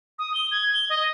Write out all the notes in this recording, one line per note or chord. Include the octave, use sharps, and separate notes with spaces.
D#6
G7
G#6
G7
D#5